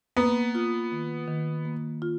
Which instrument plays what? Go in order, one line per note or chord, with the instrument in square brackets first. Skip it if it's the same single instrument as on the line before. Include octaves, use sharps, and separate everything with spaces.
[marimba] A#3 [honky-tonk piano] B3
[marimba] F4
D#3
D#3
A#3
F4